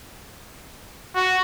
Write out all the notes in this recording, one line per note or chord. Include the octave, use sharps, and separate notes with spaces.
F#4